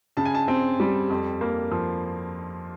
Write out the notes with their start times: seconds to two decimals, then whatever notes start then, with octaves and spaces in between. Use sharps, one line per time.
0.17 C#3 A5
0.25 G#5
0.34 A5
0.48 C4
0.80 G3
1.10 F2
1.41 A#3
1.72 F3